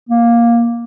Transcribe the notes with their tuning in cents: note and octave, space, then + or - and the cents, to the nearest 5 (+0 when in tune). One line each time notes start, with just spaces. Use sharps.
A#3 +10